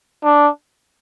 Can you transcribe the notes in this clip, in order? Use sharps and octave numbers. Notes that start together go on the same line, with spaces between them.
D4